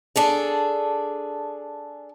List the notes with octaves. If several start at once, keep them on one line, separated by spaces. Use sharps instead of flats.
D4 G#4 A4